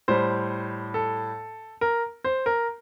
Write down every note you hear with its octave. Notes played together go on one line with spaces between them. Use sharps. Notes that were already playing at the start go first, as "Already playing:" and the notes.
A2 G3 C5
A4
A#4
C5
A#4